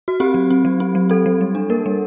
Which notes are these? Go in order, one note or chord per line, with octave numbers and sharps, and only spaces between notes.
F#4
C4 G4
F#3
C4
F#3
C4
F#3
C4 A4
F#3
G3
D4
A#3 A#4
G3